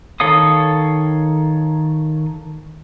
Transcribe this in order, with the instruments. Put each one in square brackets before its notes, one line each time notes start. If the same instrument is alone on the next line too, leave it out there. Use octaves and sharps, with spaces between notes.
[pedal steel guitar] D#3 A4 C#5 F5 D#6